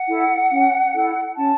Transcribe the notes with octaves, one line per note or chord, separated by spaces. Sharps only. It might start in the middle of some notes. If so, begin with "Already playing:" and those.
Already playing: F#5
E4 A4
C#4
E4 A4
C#4 A5